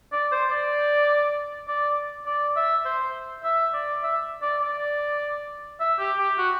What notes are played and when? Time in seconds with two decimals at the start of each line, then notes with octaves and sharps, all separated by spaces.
0.12 D5
0.32 C5
0.51 D5
1.68 D5
2.27 D5
2.56 E5
2.85 C5
3.44 E5
3.73 D5
4.03 E5
4.42 D5
4.62 D5
5.80 E5
5.99 G4
6.18 G4
6.38 F#4